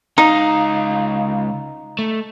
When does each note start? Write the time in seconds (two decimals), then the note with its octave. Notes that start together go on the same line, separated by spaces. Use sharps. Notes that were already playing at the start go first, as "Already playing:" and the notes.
0.18 C#2 D#4 F5
1.99 A3